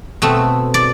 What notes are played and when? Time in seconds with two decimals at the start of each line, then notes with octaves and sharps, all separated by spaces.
0.22 B2 A3 C4
0.74 D5